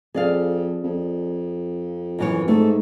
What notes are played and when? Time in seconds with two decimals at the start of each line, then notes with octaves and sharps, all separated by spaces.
0.14 F2 G#4 D5 F5
0.84 F2
2.19 F#2 E3 C#5
2.48 G#2 A3